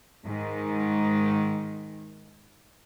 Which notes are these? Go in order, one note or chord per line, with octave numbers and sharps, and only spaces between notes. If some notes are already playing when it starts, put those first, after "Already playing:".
G#2 D#3